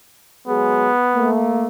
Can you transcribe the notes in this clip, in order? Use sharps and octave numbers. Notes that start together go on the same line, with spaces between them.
F#3 G#3 B3 G#4
A3 A#3